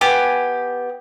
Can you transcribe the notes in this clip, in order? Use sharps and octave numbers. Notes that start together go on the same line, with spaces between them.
B3 G4 G#5